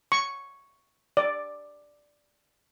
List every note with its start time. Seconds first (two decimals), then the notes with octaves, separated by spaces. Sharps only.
0.12 C#6
1.17 D5